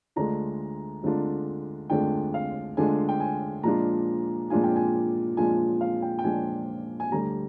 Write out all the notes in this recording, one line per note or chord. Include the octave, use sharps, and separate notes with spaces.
D2 D3 G#3 D4 F4 A#5
D2 D3 G#3 D4 F4
D2 D3 G#3 D4 F4 G5
F5
D2 D3 G#3 D4 F4 G#5
G5
G#5
A#2 F3 G#3 D4 F4 A#5
A#2 F3 G#3 D4 F4 G#5
G5
G#5
A#2 F3 G#3 D4 F4 G#5
F5
G5
G5
A#2 F3 G#3 D4 F4 G#5
G#5
D2 D3 G3 A#5